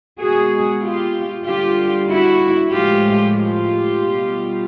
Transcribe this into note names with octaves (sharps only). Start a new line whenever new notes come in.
B2 G#3 F#4 G#4
F4 G4
D3 G3 F4 G4
E4 F#4
A2 F3 G#3 F4 G4
F4 G4
B2 G3